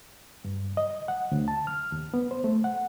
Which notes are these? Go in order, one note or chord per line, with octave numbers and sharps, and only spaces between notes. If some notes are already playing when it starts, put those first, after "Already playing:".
G2
D#5
F#5
D2
A5
F6
D#2
B3
C5
A3
F#5